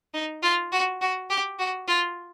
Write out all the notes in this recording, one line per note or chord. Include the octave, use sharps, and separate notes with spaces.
D#4
F4
F#4
F#4
G4
F#4
F4